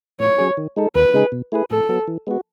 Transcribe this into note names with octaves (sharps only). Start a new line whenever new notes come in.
A2 C#5
F#3 C#4 G#4
D#3
G#3 D#4 A4
D#2 B4
C#3 G#3 D#4 G#4
B2
A3 E4 G#4 B4
A2 A4
F#3 B3
E3
G#3 B3 F#4